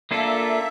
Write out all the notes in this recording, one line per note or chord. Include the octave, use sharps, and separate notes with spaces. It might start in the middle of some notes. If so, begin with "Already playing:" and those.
A#3 D4 F4 A4 E5